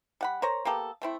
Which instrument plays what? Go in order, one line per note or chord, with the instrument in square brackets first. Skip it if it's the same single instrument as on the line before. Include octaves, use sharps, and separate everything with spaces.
[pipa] G3 F#5 B5
A#4 C5 C#5 A#5
A#3 B3 G4 A4
A3 C4 E4